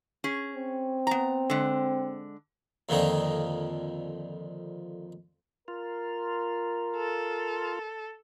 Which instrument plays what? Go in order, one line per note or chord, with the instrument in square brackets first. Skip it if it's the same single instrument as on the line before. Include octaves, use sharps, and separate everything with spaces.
[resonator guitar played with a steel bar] C#4 G#4
[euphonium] C4
[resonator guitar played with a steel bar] B3 A#5
D3 G#3
[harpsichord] F2 A#2 D3 D#3 F3 D#4
[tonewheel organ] F4 [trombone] A#4
[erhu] A4